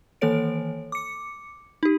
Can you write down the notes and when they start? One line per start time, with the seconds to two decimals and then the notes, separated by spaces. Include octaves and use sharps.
0.21 D#3 E3 A#3 A4 C#5 D7
0.92 D6 C#7
1.83 D#4 G4